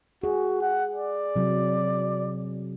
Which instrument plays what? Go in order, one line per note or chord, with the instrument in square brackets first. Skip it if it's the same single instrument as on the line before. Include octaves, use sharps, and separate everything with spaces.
[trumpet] F#4 [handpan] G#4
[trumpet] F#5
D5
[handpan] C3 F#3